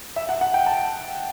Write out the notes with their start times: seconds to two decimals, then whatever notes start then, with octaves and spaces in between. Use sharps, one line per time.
0.16 E5
0.29 F#5
0.41 F#5
0.54 G5
0.66 A5